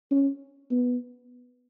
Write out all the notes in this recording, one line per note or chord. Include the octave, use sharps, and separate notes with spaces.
C#4
B3